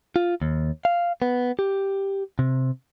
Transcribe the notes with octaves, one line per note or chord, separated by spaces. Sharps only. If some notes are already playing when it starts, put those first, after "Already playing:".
F4
D#2
F5
B3
G4
C3